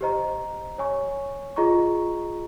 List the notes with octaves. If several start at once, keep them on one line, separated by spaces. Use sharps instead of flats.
G4 C5 D#5 A#5
C#5 G#5 C#6
F4 G#4 D#5 A#5 C#6